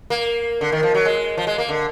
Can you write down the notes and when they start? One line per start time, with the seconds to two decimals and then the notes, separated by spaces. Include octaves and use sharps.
0.10 A#3
0.61 D3
0.72 D#3
0.83 F3
0.94 F#3
1.05 G#3
1.38 F3
1.47 G#3
1.58 A#3
1.68 D3